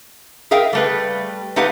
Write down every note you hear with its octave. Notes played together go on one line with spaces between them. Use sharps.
G#4 A#4 E5 F5 G5
G3 A3 B4
A3 D#4 G4 B4 F5 F#5